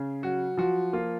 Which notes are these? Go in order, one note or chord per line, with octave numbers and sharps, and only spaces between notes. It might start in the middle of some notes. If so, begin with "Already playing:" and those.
Already playing: C#3
F#3 F#4
F3 F#4
A#3 F4